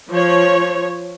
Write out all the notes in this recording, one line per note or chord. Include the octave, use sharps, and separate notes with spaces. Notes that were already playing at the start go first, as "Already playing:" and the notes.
F3 C#5